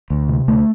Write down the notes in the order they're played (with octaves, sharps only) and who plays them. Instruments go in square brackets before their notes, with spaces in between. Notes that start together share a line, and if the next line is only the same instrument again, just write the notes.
[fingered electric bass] D2
C3
D2 A3